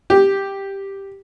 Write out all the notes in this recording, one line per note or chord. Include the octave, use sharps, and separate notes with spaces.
G4